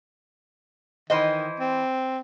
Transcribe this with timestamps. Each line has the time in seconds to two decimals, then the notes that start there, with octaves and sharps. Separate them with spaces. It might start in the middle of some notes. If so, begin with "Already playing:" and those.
1.10 D#3 E3 C5 D#5
1.60 C4